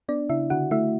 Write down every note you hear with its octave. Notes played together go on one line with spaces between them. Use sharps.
B3 D4 D5
C#3 E4 E5
D3 F#4 F#5
A3 E4 E5